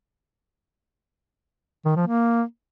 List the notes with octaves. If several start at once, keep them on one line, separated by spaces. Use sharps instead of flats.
D#3
F3
A#3